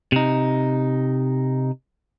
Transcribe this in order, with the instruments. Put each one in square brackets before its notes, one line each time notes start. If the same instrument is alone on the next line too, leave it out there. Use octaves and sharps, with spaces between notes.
[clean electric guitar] C3 D#4